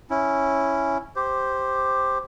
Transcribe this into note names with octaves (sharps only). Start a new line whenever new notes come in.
C#4 E4
G4 C5